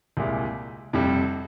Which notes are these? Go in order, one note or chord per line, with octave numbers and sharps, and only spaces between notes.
C2 A#2 G#3 E4 G4
F1 F2 C3 G3